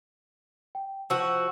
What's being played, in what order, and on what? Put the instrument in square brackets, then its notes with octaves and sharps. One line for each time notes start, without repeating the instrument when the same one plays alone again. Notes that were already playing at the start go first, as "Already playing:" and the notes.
[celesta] G5
[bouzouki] F3 F#4 [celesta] E6